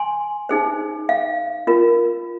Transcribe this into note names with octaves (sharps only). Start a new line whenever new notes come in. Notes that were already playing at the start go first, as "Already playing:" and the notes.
Already playing: G#5 C6
D#4 G#4 C5
F5
F4 A#4